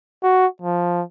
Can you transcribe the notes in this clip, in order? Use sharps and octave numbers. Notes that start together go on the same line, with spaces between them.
F#4
F3